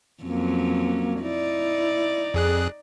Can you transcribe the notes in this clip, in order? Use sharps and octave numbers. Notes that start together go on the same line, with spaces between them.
F2 F#3 A#3 C#4
D#4 E4 D5
F2 G#4 F#6